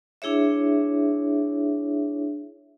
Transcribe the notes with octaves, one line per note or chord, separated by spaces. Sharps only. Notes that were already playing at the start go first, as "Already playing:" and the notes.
D4 E4 G#4 C#5 E5